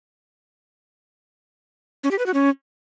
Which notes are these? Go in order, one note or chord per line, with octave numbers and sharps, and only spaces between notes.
C#4
G4
B4
F#4
C#4